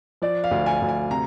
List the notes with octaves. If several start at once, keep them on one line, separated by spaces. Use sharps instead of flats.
F3 D5
F5
D2
G#5
D2
G#5
C3 A#5